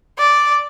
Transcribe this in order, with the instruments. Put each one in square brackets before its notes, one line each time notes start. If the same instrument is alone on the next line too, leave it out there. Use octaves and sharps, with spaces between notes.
[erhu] D5